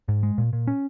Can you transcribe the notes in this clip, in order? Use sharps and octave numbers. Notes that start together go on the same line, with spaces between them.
G#2
G#3
A#2
A#2
C#4